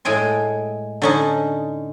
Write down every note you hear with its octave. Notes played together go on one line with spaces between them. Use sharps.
A2 G#3 G5 G#5 C6
D3 C#4 D#4